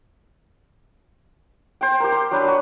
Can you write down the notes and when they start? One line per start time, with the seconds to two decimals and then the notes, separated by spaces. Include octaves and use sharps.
1.81 C5 G5
2.00 G4 A#4
2.12 C6
2.31 F#3 D4 B4
2.47 F#4